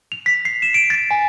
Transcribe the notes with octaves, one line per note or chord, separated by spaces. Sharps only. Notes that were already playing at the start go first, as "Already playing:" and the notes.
F7
B6
C7
E7
D7
A6
G#5